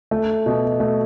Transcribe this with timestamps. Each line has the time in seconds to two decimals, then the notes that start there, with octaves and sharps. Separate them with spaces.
0.11 A3
0.46 B2
0.80 A3